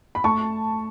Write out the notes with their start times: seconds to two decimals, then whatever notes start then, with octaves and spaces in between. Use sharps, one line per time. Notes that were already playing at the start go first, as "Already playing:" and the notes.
0.15 B5
0.24 A3 A5 C#6